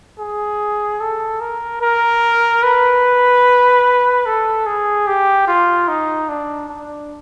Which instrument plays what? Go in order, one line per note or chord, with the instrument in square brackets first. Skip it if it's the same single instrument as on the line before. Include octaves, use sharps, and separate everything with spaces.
[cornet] G#4
A4
A#4
A#4
B4
A4
G#4
G4
F4
D#4
D4
D4